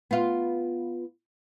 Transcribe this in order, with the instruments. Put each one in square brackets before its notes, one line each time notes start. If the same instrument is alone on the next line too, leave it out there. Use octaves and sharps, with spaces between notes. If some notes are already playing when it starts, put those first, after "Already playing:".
[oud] B3 F4